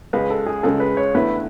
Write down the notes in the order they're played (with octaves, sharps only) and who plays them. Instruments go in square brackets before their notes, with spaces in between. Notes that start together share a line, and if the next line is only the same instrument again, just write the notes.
[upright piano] C#2 C#3 G#3 [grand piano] B4
[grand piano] A4
G#4
[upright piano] C#2 C#3 G#3 [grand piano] A4
[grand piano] B4
C#5
[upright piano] E2 D3 A3 E4 [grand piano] B4